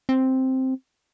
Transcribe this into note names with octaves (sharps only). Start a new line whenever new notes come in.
C4